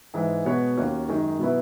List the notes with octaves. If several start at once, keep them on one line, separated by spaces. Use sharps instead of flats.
G#2 E3 G#3
B2 G#3 B3 F#4 C#5
D#2 D#3 A#3 C#4 F#4
F#2 D#3 G#3 D#4
B2 F#3 B3 E4 B4